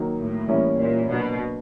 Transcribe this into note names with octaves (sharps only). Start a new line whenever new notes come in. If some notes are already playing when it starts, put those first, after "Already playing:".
Already playing: D#3 F#3 A#3 D#4
A2
E3 G3 A#3 C#4 E4
A#2
B2 F#3 A#3 D4